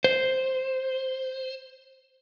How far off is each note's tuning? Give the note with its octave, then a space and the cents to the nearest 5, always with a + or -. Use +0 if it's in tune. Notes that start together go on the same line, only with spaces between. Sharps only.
C5 +0